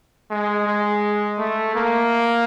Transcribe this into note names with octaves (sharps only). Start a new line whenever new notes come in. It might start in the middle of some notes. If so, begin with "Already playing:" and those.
G#3
G#3
A3
A#3